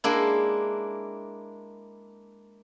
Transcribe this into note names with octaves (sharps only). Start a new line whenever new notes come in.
G#3 A#3 D4 E4